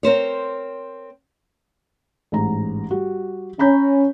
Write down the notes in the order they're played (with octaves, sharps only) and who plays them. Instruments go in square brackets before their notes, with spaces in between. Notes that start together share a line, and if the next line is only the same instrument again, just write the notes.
[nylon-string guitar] C4 A#4 C5 C#5
[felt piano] A1 G#2 A#5
G3 F#4
[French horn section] C#4 [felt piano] A#5 B5 G6